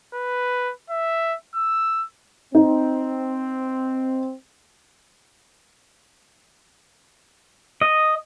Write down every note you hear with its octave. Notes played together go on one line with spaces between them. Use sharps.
B4
E5
E6
C4 D#4
D#5